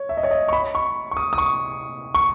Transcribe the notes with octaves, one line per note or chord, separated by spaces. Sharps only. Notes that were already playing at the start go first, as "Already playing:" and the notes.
Already playing: C#5
E5
D#5
C#5
D#5
C#6
B5
C#6
C#6
D#6
D#6
C#6
C#6